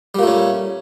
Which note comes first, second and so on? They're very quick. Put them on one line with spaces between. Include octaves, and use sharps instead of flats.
G3 A#2 A3 C#4